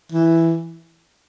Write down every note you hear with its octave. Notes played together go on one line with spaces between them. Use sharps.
E3